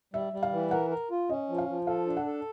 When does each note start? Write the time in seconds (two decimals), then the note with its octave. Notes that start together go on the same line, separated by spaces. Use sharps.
0.14 G3 E5
0.33 G3
0.43 F5
0.52 E3
0.71 A#4 F#5
0.90 A#4
1.11 F4
1.29 C#4 D#5
1.49 F3
1.58 F5
1.68 F3
1.87 A4 F5
2.06 D4
2.17 F#5
2.26 A4